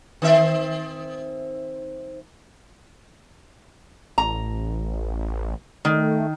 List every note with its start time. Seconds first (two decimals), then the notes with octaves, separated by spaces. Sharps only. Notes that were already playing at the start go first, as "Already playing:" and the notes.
0.22 D#3 C4 E5
4.18 A1 A#5
5.85 D#3 A3